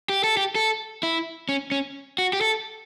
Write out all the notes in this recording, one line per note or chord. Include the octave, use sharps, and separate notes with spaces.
G4
A4
G4
A4
E4
C#4
C#4
F#4
G4
A4